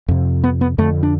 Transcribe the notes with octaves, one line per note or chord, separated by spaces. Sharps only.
F2 C3
B3
B3
F2 D3 A3
D4